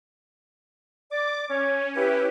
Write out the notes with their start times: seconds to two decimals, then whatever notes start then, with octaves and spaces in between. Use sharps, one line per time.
1.11 D5 D6
1.49 C#4 C#5
1.96 C#4 E4 G4 B4